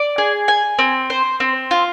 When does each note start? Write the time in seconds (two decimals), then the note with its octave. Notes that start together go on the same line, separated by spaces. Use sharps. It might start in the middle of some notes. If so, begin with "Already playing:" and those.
Already playing: D5
0.18 G#4
0.48 G#5
0.79 C4
1.10 C5
1.40 C4
1.71 F4